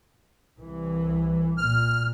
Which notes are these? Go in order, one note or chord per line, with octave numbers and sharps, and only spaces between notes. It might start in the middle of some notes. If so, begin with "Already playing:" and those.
C2 E3
A#2 F6